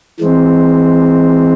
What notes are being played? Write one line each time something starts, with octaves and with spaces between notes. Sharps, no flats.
E3 G#3 C4